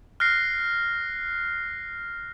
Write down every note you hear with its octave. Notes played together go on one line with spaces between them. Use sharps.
F6 F#6 A#6 C7